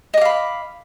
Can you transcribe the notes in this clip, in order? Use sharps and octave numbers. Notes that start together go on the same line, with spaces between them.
D#5 F5 B5 D6